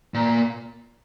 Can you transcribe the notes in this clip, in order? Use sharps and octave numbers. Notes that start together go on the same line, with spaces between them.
A#2